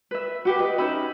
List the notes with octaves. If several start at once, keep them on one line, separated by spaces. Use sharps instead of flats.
B4 E5
F#4 G4 B4
B4 D#5
C#4 D#4 E5 B5